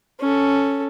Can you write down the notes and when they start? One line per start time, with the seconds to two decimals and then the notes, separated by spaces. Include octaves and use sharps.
0.20 C#4 A4